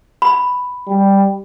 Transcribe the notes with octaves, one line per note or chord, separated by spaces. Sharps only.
B5
G3